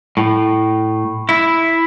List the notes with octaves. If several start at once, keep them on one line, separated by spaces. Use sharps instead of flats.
A2
E4